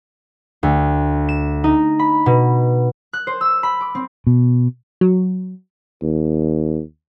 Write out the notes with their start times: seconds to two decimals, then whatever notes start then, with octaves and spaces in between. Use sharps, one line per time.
0.63 D2
1.29 E7
1.64 D#4
1.99 B5
2.26 B2
3.13 F#6
3.27 C5
3.41 E6
3.63 B5
3.81 D6
3.95 C4
4.27 B2
5.01 F#3
6.02 D#2